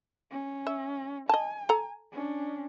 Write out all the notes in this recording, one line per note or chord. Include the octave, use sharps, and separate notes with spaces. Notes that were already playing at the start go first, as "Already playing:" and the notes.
C#4
E5
D#5 G#5 A5
A4 A#5
C#4 D4